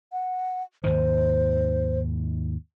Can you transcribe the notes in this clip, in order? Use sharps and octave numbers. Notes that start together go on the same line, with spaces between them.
F#5
D#2 G#2 D#3 C5